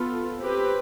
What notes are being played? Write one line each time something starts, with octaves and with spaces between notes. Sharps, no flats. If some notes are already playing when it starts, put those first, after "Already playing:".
Already playing: B3 F4 A4
C4 G4 B4